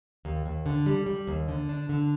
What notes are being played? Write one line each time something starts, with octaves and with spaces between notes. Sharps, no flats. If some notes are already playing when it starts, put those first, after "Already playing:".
D#2
D#2
D3
G3
G3
D#2
D3
D4
D3